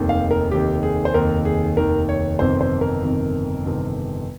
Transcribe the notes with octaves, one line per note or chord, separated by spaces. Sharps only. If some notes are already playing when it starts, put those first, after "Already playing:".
Already playing: F1 D#2 D#3
F5
A#4
F1 D#2 D#3 G4
G#4
C5
F1 D#2 D#3 A#4
G#4
F1 D#2 D#3 A#4
C#5
G1 F2 C3 D#3 C5
C5
A#4
G1 F2 C3 D#3
G1 F2 C3 D#3